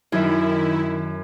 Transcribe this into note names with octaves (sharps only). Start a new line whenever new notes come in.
F#2 D#3 E4